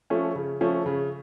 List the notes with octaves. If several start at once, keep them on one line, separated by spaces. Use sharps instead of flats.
F3 A3 C#4
C#3
F3 A3 C#4
C#3